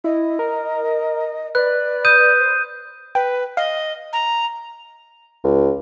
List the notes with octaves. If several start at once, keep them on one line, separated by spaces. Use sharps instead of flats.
E4 D#5
A#4
B4 D5 F#6
D#6 G6 D#7
C5
B4 G5
D#5 F5
A#5
C#2